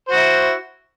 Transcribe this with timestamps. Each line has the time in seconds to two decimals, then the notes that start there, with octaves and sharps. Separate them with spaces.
0.08 C5
0.11 F#4
0.15 E4